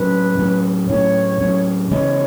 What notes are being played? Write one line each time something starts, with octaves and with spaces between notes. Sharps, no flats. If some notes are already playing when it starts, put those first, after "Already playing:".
Already playing: A2 F#3 C#4 B4
A2 F#3 C#4
A2 F#3 C#4 C#5
A2 F#3 C#4
C#3 E3 G#3 C#4 C#5